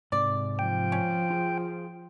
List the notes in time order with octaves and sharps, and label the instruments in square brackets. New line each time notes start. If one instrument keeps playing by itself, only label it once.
[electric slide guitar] G#2 C3 [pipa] D5
[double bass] F3 [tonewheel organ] G5
[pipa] C#4
[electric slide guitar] F4 G#4